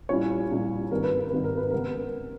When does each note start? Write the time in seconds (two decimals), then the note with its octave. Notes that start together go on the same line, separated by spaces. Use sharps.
0.09 A#1 A#2 G3 C#4 E4 C#5
0.51 A#1 A#2 G3 C#4 E4
0.91 G#1 G2 D#3 A#4
1.04 B4
1.18 A#4
1.30 G#1 G2 D#3 B4
1.44 A#4
1.57 B4
1.70 C#3 G#3 B3 A#4